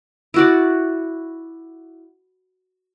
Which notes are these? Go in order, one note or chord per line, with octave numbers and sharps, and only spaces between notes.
E4 F#4 D5